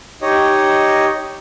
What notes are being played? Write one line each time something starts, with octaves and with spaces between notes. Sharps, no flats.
D#4 G4 C#5 D#5